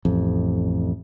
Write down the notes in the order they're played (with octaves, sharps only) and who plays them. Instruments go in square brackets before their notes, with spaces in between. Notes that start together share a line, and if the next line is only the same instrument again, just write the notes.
[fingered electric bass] A1 F2